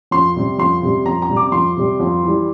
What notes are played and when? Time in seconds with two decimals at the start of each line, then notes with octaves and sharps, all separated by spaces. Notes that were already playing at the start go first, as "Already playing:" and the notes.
0.11 F2 C6
0.36 C3 G3
0.59 F2 C6
0.82 C3 G3
1.05 F2 A#5
1.22 A#5
1.29 C3 G3
1.36 D6
1.52 F2 C6
1.77 C3 G3
2.00 F2
2.23 E3 G3